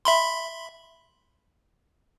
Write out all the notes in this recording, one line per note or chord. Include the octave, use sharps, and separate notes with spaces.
E5 B5 C6